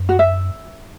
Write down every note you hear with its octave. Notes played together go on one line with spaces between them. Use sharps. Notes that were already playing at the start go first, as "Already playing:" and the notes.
Already playing: F#2
F#4
E5